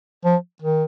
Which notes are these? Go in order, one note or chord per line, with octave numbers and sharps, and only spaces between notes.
F3
D#3